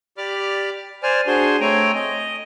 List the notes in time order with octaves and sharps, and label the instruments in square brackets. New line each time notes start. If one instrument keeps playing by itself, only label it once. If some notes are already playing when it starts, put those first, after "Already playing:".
[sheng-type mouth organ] G4 D5 B5 D6 F6
C5 D5 G#5 F6
D4 F#4 G#4 C5 G#5 C6
A3 C4 C#5 G5 G#5 A#5
D#5